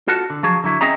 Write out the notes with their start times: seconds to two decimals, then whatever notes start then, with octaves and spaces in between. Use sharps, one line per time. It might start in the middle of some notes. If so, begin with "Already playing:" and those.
0.08 F4 F#4 A4
0.30 D3
0.43 F3 F#3 G#4
0.64 D3 F#3 E4
0.81 C4 C#4 G#4 D#5 E5 A#5